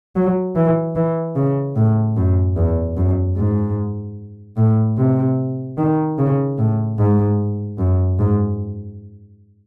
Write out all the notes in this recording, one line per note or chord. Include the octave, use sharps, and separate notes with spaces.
F#3
E3
E3
C#3
A2
F#2
E2
F#2
G#2
A2
C3
D#3
C#3
A2
G#2
F#2
G#2